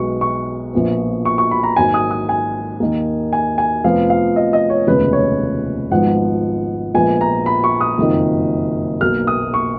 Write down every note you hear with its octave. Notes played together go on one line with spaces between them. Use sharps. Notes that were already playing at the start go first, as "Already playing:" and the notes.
Already playing: B1 B2 G#3 B3 C#6
C#6
A#1 A#2 F3 B3
C#6
C#6
B5
A#5
G#1 G#2 F#3 A#3 G#5
D#6
D#6
G#5
D#2 D#3 A#3
G#5
G#5
F1 F2 F3 B3 F5
F5
D#5
D#5
C#5
F1 D#2 C#3 G#3 B3 B4
C#5
G#1 G#2 F3 B3 F#5
A#1 A#2 F3 G#3 B3 G#5
A#5
B5
C#6
D#6
F#1 F2 D#3
B1 B2 A#3 F6
D#6
C#6